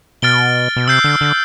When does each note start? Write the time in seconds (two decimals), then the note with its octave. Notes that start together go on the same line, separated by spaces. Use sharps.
0.22 B2 F6 A6 D7 G7
0.76 B2
0.88 C3 E6 G6 C7
1.04 D3
1.21 D3